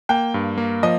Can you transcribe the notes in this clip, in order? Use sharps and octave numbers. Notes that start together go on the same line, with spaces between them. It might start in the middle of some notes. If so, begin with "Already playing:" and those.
A#3 G5
G2
A#3
F3 D#5